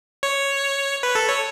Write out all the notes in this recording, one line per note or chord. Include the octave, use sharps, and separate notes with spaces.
C#5
B4
A4
C#5